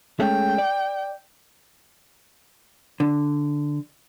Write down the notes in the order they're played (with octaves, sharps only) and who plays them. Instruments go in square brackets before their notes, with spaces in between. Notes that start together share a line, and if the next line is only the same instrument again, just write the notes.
[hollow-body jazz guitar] G#3 A3 C#4 [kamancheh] G5
[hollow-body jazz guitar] D5
D3